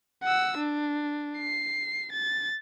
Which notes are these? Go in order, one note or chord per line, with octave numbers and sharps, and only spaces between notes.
F#5 E6
D4
C7
A6